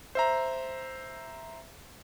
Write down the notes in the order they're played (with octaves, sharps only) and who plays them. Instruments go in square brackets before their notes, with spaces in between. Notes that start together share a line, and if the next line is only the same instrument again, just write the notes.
[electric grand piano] C5 E5 A#5